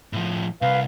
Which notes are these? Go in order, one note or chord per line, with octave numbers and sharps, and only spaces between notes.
A2 F3
C2 B4 F5